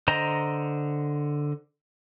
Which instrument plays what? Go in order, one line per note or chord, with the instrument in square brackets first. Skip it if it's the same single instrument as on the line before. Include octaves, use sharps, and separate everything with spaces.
[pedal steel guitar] D3 C5 D#5 A#5